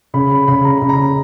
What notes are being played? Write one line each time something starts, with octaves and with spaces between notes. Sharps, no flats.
C#3 B5
B5
C#3 B5
A#5
C#3 B5
A#5